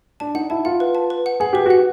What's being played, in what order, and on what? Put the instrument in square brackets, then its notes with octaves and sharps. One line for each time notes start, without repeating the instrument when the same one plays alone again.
[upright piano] D4 [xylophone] A5
[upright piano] D#4 [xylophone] F#5
[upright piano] E4 [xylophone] A5
[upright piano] F4 [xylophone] F#5
[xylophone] B4
A5
B4
F#5
[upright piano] G#4 [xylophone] F#5
[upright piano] G4 [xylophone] B4
[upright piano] F#4 [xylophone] F#5